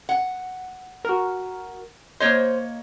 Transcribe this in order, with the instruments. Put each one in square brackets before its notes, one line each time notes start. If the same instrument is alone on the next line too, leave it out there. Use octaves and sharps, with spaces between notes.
[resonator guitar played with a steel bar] F#5
[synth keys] F#4 A#4
[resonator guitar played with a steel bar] A#3 C#5 D#5 [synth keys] C5